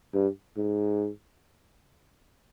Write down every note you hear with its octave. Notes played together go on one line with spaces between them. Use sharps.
G2
G#2